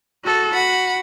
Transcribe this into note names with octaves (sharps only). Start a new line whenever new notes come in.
F#4 A4
F#4 F#5 B5